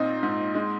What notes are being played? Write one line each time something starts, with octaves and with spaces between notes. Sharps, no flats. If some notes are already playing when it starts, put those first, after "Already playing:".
Already playing: A#2 C4 D#4
G#2
G#3